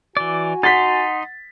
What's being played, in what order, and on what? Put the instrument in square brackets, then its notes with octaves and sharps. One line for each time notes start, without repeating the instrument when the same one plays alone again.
[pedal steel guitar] E3 D5 [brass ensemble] F#4 G#5
[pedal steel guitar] D#4 C6 [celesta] F#5 [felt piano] A6 B6